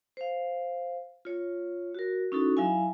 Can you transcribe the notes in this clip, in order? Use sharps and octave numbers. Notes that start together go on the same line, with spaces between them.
C5 F5
F4 C#5
F#4 A#4
C#4 D#4 E4 F#4 A4
F#3 E4 E5 F5 G#5